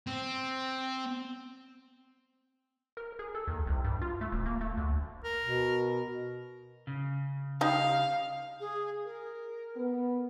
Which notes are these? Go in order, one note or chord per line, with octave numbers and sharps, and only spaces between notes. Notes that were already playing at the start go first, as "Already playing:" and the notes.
C4
A#4
G#4
A4
D#2
C2
G2
F4
A3
D#1
A#3
A3
D2
A#4
B2
C#3
G3 D#4 D#5 F5
G#4
A#4
B3